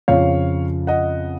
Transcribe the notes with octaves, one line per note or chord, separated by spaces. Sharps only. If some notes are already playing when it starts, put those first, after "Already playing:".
F2 C#3 F3 C#5 F5
D#5 F#5